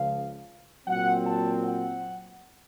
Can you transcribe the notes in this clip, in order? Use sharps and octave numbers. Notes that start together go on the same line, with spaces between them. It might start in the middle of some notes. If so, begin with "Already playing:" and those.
Already playing: C#2 C#3 F3 F5
A#2 F#3 C4 F#5
A5
F#5